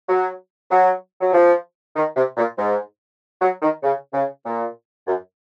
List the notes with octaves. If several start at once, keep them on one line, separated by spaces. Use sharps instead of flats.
F#3
F#3
F#3
F3
D#3
C3
A#2
G#2
F#3
D#3
C#3
C#3
A#2
F#2